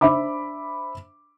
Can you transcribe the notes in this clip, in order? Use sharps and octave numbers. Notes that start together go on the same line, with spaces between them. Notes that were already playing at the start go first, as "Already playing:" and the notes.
D4 C5 E5 B5 D6